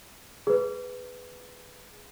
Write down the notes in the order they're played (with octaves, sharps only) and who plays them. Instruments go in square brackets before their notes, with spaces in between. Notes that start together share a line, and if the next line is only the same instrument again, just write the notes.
[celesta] G#4 B4